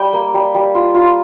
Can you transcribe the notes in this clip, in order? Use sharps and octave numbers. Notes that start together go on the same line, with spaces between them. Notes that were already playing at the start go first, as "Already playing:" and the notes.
Already playing: G3 G5
A#3
G3
G3
F4
F4